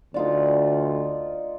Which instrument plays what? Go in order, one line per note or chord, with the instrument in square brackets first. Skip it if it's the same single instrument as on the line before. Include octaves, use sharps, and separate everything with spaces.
[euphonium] D2 [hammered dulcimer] D#4 F4 D5